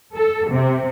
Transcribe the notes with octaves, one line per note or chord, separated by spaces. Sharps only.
A4
C3